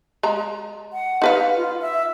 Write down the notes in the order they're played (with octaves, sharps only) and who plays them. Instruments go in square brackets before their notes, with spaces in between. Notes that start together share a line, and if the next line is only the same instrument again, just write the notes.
[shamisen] G#3 A#5
[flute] F#5
[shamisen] D#4 B4 F5
[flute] F4
E5